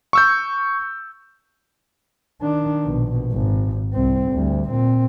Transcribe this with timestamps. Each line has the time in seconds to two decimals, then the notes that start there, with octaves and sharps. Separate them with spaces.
0.13 C#6 E6 G6
2.42 D#3 D4
2.84 A#1 B2
3.31 G#1
3.93 C2 C4
4.32 D2 G3
4.68 A#2 C4